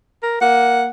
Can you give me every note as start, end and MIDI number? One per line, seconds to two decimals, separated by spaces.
0.23 0.36 70
0.41 0.90 58
0.41 0.90 78